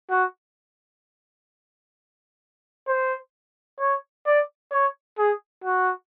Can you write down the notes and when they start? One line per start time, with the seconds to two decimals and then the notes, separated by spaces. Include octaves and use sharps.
0.10 F#4
2.88 C5
3.80 C#5
4.26 D5
4.72 C#5
5.18 G#4
5.64 F#4